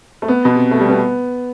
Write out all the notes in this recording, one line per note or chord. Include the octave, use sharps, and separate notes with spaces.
A3
B3
B2
C3
A3
G3
B3